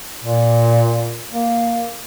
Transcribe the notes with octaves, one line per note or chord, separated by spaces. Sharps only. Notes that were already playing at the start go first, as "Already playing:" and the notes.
A#2
A#3